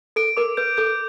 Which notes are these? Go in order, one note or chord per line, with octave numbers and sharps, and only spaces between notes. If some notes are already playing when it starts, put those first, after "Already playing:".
A4 D7
A#4 D6
B4 G6
A4 G6